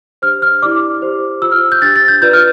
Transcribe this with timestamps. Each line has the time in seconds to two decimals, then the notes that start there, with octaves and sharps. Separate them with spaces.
0.22 D4 G4 C5 F6
0.42 F6
0.62 E4 G4 D5 D6
1.02 G4 C5
1.42 F4 C5 E6
1.52 F6
1.72 G6
1.82 D4 G4 C5 A6
1.96 A6
2.08 G6
2.22 F4 B4 D5 G6
2.33 F6